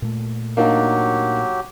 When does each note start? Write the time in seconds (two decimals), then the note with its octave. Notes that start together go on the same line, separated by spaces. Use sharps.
0.02 A#2 A3
0.57 F#3 A#3 D4 D#4 G4